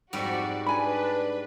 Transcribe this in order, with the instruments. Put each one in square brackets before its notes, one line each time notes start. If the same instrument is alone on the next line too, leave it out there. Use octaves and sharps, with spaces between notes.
[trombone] F2 [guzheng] G#2 G3 [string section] F#4 D5
[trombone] D4 [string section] B4 [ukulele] D5 G#5 B5